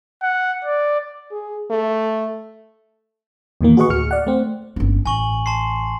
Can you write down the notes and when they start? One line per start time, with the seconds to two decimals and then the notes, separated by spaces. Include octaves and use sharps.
0.23 F#5
0.65 D5
1.31 G#4
1.70 A3
3.61 E2 A#2 D#3 A#3
3.77 F#4 G#4 B4 D#5 F#5 C#6
3.89 D2 A2 F#4 F6 C#7
4.11 D5 F#5
4.27 A3 C4
4.76 G1 C#4
5.06 A1 G#5 C#6 F#7
5.46 A5 C6 C7